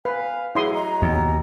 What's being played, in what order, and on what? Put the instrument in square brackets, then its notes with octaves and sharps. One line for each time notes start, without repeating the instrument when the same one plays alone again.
[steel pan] B4 [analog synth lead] F5 [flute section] G#5
[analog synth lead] F#3 [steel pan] E4 C6 D#6 [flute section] G#4
[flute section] D#5 A#5
[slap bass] D#2 [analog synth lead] B2